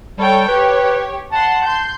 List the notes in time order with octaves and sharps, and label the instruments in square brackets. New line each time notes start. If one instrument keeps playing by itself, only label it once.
[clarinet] G3 [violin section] A4 C#5 G5
[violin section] G4 C#5 [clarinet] B4
[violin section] F#5 C6 [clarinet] A5
[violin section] C6 G6